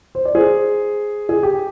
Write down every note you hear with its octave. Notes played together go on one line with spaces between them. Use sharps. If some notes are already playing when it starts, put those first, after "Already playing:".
C5
D5
G#4 C5
G#4
G4